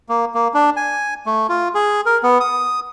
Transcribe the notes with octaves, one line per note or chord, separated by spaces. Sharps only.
A#3
A#3
D4
G#5
A3
F4
G#4
A#4
B3
D#6